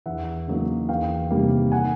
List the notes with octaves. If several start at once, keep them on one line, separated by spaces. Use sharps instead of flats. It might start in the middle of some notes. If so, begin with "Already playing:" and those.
E2 E5 F#5
C#3 F#3 A#3 D#4
E2 F5 G5
C3 D#3 G3 A#3
F#5 G#5